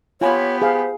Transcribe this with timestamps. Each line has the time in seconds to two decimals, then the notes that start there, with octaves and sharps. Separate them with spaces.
0.21 B3 F4 G4 C#5 G#5 B5
0.62 G#4 C5 F5